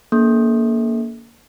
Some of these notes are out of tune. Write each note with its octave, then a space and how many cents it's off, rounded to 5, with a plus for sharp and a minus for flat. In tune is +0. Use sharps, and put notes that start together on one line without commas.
A#3 +0 D4 -45 A4 -35